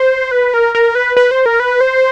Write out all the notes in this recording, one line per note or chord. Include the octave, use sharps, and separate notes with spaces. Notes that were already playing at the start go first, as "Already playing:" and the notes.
Already playing: C5
B4
A#4
A#4
B4
B4
C5
A#4
B4
C5